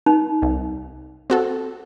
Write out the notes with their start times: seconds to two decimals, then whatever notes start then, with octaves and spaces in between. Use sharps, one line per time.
0.06 D#4
0.42 C2
1.30 C4 F#4 A4